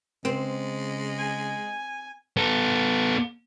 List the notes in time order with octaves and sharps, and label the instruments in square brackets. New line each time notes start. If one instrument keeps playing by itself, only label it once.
[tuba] C#3 [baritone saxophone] G#3 [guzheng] C4
[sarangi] G#5
[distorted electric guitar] B3 A4